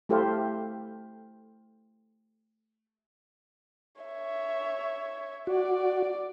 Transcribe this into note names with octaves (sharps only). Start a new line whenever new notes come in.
A3 E4 G4 A4 C5 F5
C#5 E5
F#4 D5